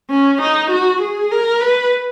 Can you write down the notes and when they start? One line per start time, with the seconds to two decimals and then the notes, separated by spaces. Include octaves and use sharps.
0.11 C#4
0.42 D#4
0.71 F#4
1.02 G#4
1.32 A#4
1.61 B4